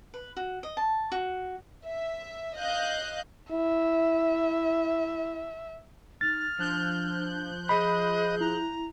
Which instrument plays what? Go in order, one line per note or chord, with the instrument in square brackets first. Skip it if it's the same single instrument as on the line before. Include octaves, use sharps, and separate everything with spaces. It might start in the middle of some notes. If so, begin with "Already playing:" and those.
[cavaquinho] B4
F#4
D#5
A5
F#4
[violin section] E5
D#5 F5 F#6 G6
[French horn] E4 [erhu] E5
[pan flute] D#4 [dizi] F6 [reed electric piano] A6
[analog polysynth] F3 F#6 G6 [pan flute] D4
[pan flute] G#4 [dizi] D#5 [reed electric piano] B5
[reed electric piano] E4 [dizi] A#5